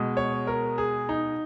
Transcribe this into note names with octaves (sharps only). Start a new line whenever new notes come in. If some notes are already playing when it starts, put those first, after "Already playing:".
Already playing: B2 G#3
C#5
A#4
G#4
D#4